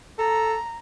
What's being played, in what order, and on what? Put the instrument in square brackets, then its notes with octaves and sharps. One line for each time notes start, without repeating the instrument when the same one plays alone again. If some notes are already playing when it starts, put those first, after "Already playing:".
[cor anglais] A4 [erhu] A#5